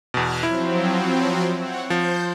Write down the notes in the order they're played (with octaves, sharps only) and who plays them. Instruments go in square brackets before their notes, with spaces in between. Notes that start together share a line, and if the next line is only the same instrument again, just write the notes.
[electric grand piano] E2 B2 [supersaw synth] F6 F#6 G#6
[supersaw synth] F3 F#3 C4 [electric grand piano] E4
[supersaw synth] C4 C#5 F#5
[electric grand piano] F3 [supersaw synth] C5 G6